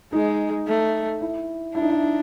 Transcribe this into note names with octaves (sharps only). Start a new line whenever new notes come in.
G#3 D#4
A3
E4
D4 E4
D#4
E4